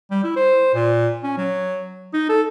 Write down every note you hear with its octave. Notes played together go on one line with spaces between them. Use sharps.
G3
E4
C5
A#2
C#4
F#3
D#4
A4